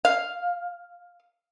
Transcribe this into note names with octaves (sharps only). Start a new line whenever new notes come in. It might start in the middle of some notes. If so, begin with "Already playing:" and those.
F5